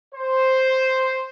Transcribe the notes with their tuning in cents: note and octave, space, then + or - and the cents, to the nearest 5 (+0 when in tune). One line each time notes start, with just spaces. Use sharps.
C5 +0